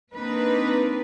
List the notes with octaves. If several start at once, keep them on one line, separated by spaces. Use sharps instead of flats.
A#3 C4 D4 D#4 B4